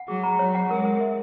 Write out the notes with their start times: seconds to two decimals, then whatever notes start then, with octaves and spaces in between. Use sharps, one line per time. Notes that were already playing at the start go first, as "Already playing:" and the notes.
Already playing: F#5
0.08 F#3 G#4
0.23 A#5
0.39 F#3 C#5
0.55 F#5
0.70 G#3 A#4
0.85 A#4
1.01 E5